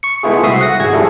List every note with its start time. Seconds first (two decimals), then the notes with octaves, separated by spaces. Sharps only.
0.03 C#6 C#7
0.23 G#3 A3 B3 E4 F4 G#4
0.43 C2 C4 F#4 E5 D#6 C7
0.61 F#5 A#6
0.80 G#1 F#4 G#4 G#6
0.92 F3 G3 A3 E4 G#4 A4